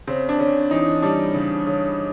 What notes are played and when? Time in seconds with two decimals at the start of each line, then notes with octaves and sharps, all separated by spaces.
0.07 C#3 C4
0.29 D4
0.39 C#3 C#4
0.71 E3 D#4
1.02 G3 D4
1.34 C#3
1.66 C#3